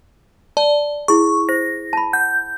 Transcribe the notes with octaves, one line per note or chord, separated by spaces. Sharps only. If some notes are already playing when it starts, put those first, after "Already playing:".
D5 A5
E4 G#4 C#6
C5 A#6
A5 B5
F#5 G6